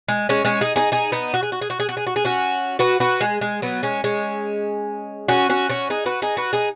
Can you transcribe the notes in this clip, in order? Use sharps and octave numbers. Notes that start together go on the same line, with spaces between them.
G#3
G#3 C#4
G#3 C#4
D#4 G#4
D#4 G#4
D#4 G#4
B3 D#4
F#4
G#4
F#4
G#4
F#4
G#4
F#4
G#4
F#4
G#4
C#4 F#4
F#4 B4
F#4 B4
G#3
G#3
F#3 B3
G#3 C#4
G#3 C#4
C#4 F#4
C#4 F#4
C#4 F#4
D#4 G#4
F#4 B4
D#4 G#4
F#4 B4
D#4 G#4